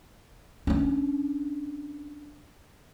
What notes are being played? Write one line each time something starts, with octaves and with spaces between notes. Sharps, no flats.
C#4 D4